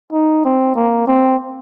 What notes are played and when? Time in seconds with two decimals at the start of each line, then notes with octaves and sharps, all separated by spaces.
0.13 D#4
0.45 C4
0.76 A#3
1.07 C4